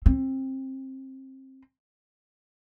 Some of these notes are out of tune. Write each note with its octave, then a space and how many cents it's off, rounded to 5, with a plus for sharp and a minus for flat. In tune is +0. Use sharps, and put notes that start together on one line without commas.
C4 +25